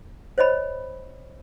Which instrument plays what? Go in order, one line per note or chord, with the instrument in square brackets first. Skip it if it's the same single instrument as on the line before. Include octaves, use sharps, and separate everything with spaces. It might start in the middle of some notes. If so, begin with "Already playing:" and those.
[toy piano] C5 C#5 D#5 B5